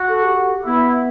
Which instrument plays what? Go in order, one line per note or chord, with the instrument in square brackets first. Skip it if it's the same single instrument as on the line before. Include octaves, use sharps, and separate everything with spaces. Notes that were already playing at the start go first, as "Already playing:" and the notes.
Already playing: [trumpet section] F#4
[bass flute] A4
G4
[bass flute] B3 [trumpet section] E4